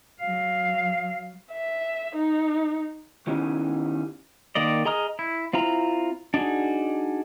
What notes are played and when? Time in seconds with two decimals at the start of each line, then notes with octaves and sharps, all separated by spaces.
0.20 F#3 F5
1.52 E5
2.16 D#4
3.27 D#3 B3 C#4 D#4 E4 G4
4.55 D#3 A#3 D5 D#5
4.85 G#4 D#5 A#5 D#6 F6
5.19 E4
5.53 C4 E4 F4 A#5
6.34 D4 D#4 F#4 G#4